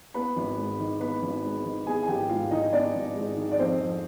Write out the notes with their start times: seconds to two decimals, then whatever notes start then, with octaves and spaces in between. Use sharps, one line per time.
0.14 B3 B4 B5
0.36 G#1
0.58 G#2
0.80 D#3
1.01 B3 B4 B5
1.23 G#1
1.44 G#2
1.65 D#3
1.87 B3 G#4 G#5
2.03 G#5
2.08 G#1 G4 G5
2.29 G#2 F4 F5
2.51 D#3 D#4 D#5
2.73 B3 D4 D5
2.94 G#1
3.16 G#2
3.37 D#3
3.52 D5
3.59 F2 C4 C5
3.80 F2